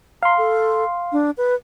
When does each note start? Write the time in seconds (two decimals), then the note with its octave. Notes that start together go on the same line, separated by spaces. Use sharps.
0.23 F5 A#5 C6
0.38 A4
1.12 D4
1.37 B4